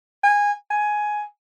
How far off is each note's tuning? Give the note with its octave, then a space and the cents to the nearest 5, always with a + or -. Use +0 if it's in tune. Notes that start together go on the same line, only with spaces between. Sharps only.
G#5 -15
G#5 +10